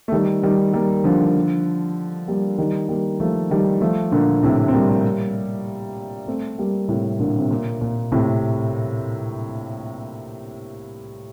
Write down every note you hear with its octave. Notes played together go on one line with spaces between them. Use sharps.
A3
D#3 G3
D#3 G3
G3 A#3
D3 F3
G3 A#3
D#3 G3
G3 A#3
F3 A3
D#3 G3
F3 A3
A#2 D3
A2 C3
C4
G3 A#3
A3 C4
G3 A#3
A2 C3
A#2 D3
C3
A#2
A#2
A2 C3